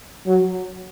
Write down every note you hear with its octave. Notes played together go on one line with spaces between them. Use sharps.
F#3